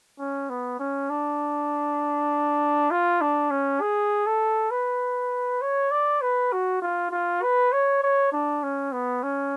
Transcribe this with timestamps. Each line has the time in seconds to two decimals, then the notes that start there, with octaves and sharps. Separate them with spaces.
0.19 C#4
0.50 B3
0.80 C#4
1.10 D4
2.91 F4
3.21 D4
3.50 C#4
3.81 G#4
4.26 A4
4.71 B4
5.62 C#5
5.91 D5
6.22 B4
6.52 F#4
6.82 F4
7.11 F4
7.42 B4
7.72 C#5
8.03 C#5
8.32 D4
8.63 C#4
8.92 B3
9.23 C#4